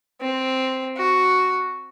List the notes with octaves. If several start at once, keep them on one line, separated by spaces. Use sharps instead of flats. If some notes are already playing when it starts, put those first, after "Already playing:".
C4
F#4